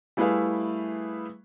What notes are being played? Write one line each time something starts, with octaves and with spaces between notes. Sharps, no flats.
G3 A3 E4 G#4 B4 F5